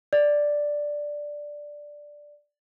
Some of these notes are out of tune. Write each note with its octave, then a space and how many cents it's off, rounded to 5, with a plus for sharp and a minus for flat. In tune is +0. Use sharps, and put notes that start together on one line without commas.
D5 +0